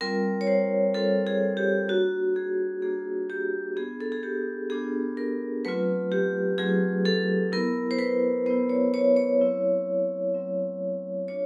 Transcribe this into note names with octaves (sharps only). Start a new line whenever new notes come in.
G3 C4 F4 A#4
C#5
C5
G3 C4 F4 A4
G#4
G4
A#3 D4 F4 F#4
G#4
A#3 D4 F4 G#4
G4
B3 D4 F4 G#4
A4
G#4
G4
B3 D4 F4 G#4
A#4
F#3 A3 C4 F4 B4
G4
F#3 A3 C4 F4 G#4
A4
B3 E4 A#4
C5
B4
B3 E4 C5
C#5
C#5
C#5
F#3 A3 C4 E4
F#3 A3 C4 E4
D4 F4 C#5